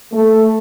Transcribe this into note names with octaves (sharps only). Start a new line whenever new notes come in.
A3